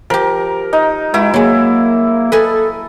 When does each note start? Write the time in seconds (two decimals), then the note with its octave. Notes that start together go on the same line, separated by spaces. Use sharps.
0.10 F3 G4 A#4
0.73 D#4
1.14 G#3 C#4 E4 F#4 B4
1.34 F#3 G#3 A#3
2.32 A4 B4 D#5 G#5